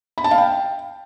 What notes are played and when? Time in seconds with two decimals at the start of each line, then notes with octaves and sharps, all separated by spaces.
0.18 B5
0.24 A5
0.31 F5
0.38 G5